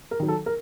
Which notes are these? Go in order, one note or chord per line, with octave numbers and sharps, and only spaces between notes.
A#4
D#3 F#3
A4
A#4